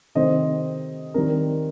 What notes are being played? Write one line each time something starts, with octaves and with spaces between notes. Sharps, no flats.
C3 D#3 A3 C4 C5 D#5
D#3 G3 C4 A#4